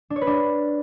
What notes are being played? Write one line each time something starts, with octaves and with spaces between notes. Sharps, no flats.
D4
C#5
B4
D4